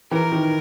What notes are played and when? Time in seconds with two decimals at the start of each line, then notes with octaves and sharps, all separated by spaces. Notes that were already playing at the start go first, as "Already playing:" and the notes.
0.11 E3 A#4
0.32 D#3